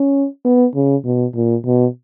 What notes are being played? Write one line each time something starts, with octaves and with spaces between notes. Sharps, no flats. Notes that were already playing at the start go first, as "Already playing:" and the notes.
Already playing: C#4
B3
C#3
B2
A#2
B2